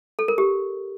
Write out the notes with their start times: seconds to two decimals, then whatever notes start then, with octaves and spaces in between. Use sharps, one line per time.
0.19 A4
0.28 A#4
0.38 G4